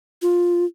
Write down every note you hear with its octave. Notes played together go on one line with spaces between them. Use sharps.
F4